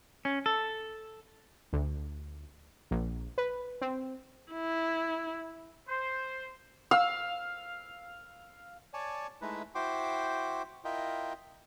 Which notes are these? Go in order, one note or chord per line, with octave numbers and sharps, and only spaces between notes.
C#4
A4
D2
A#1
B4
C4
E4
C5
F5 E6
C#5 D5 G#5 A5
G#3 A3 D#4 E4 B4
E4 F#4 C5 G5 C6 D6
E4 F4 A#4 D#5 G5